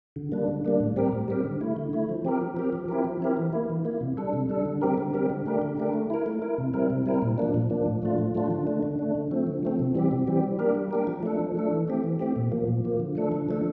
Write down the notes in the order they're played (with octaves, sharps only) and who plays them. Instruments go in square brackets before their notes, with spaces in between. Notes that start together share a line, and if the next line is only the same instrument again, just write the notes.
[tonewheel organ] D3
G3 A#3 D4
D3
G3 A#3 D4
A2
G3 C4 G4 A#4
A2
G3 C4 G4 A#4
D3
A3 E4
D3
A3 E4
F3
C4 G4 A#4
F3
C4 G4 A#4
F3
C4 E4 G4 A#4
F3
C4 E4 G4 A#4
E3
A#3 E4
E3
A#3 E4
C3
G3 D4 A4
C3
G3 D4 A4
D3
G3 C4 G4 A#4
D3
G3 C4 G4 A#4
D3
A3 D4 G4 A#4
D3
A3 D4 G4 A#4
A3
E4 A#4
A3
E4 A#4
C3
G3 C4 E4 A#4
C3
G3 C4 E4 A#4
A#2
F3 A#3 D4
A#2
F3 A#3 D4
A2
F3 A3 D4 F4
A2
F3 A3 D4 F4
D3
A3 D4
D3
A3 D4
D3
F3 A3 C4
D3
F3 A3 C4
C3
E3 G3 C4 G4
C3
E3 G3 C4 G4
G3
A#3 D4 G4 A#4
G3
A#3 D4 G4 A#4
F3
A3 D4 A4
F3
A3 D4 A4
E3
A3 C4 G4
E3
A3 C4 G4
A#2
F3 A#3
A#2
F3 A#3
D3
F3 A3 D4 A4
D3
F3 A3 D4 A4